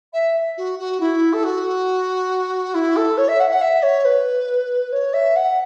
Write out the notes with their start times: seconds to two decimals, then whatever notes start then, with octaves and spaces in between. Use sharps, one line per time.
0.13 E5
0.57 F#4
0.79 F#4
1.00 E4
1.33 A4
1.44 F#4
2.74 E4
2.96 A4
3.17 C#5
3.28 E5
3.40 F#5
3.50 F#5
3.61 E5
3.82 C#5
4.05 B4
4.92 C#5
5.13 E5
5.36 F#5